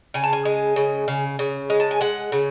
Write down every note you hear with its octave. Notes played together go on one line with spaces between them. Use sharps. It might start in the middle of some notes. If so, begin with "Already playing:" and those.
C#3 G#5
A5
G#5
G#3
C#3
C#3
C#3
G#3
A5
G#5
G#3 F#5
C#3